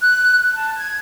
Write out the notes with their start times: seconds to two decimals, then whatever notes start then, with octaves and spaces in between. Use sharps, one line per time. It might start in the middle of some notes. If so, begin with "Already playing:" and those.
0.02 F#6
0.54 A5
0.77 G#6